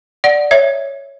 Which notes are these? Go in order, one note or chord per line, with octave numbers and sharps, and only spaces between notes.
D5 F#5
C#5 E5